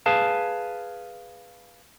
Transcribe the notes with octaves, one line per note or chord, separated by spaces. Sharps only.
G#4 B4 F5 A5